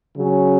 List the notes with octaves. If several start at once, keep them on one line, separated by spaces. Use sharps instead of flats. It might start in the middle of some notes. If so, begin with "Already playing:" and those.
C#3 F#3 C#4